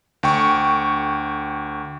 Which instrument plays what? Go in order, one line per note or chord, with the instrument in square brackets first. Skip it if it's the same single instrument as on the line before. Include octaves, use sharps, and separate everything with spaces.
[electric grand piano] D2 G5 C#6